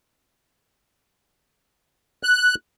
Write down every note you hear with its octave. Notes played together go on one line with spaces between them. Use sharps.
F#6